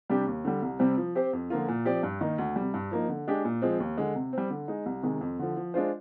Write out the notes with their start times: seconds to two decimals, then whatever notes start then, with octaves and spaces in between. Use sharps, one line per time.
0.10 C3 G3 D4 G4
0.27 D#2
0.45 D3 G3
0.62 C2
0.79 C3 G3 C4
0.97 F3
1.15 C4 G4 C5
1.33 F2
1.50 D3 F3 A#3 F4
1.68 A#2
1.85 F3 C4 G4 D5
2.03 G2
2.21 D#3 A#3 D#4
2.38 D2
2.56 C3 G3
2.74 G2
2.91 F3 A#3 D#4
3.09 D3
3.27 G#3 D4 G4
3.45 A#2
3.62 F3 G#3 C4
3.80 D#2
3.97 D3 G#3
4.15 C3
4.33 G3 C4
4.50 D3
4.68 G#3 D#4
4.86 C2
5.03 C3 D#3 G#3
5.21 F2
5.39 D3 F3
5.56 F3
5.74 G#3 D4 F4 C5